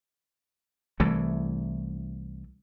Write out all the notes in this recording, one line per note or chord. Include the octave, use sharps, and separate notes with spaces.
C2 E3 A3